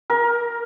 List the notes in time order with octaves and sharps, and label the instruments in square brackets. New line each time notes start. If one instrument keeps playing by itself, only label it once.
[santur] A#4